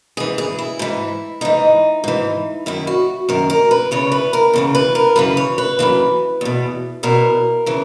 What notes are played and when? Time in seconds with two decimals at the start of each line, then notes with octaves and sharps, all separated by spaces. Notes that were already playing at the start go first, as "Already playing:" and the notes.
0.17 G#2 E3 G#4
0.38 G#4
0.58 E4
0.79 G#2 E3
1.41 G#2 E3 D#4
2.04 G#2 E3
2.66 F#2 D#3 E4
2.87 F#4
3.29 F#2 D#3 A#4
3.50 A#4
3.71 B4
3.91 E2 C#3 E3 C#5
4.12 B4
4.33 A#4
4.53 E2 C#3 E3
4.75 B4
4.95 A#4
5.16 F#2 C#3 E3 B4
5.37 C#5
5.58 B4
5.79 F#2 C#3 E3
6.41 E2 B2
7.03 E2 B2 A#4
7.66 C#3 E3